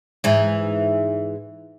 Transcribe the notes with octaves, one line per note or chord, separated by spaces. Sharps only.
G#2 E3